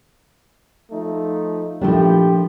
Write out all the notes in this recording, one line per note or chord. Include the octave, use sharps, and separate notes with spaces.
F3 A3 D#4
A#2 F3 A3 D4 E4 G4